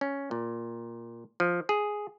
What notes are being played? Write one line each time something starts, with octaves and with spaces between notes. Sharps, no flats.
C#4
A#2
F3
G#4